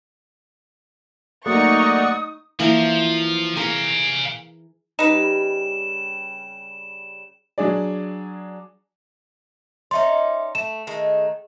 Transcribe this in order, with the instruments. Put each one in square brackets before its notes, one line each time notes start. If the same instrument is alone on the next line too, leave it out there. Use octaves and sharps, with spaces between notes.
[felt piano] F#3 A3 A#3 [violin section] D#4 C#6 [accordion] D5 F#5 [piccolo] D#6
[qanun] E3 A#3 A#4 [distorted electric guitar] F3
[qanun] G#4 A#4 [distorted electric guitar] F5 G#5
[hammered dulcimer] C#3 G3 [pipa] D#4 B4 [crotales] E7
[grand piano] F#3 D4 G#4 D5
[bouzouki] C#4 D#4 D5 [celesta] E5 C6
[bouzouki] A3 [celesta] E7
[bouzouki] D#3 G#3 A3